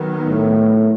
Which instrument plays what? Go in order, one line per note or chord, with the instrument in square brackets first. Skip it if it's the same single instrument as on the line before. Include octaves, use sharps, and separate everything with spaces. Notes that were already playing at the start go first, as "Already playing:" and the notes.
Already playing: [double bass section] D#3 F#3 B3
[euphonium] A2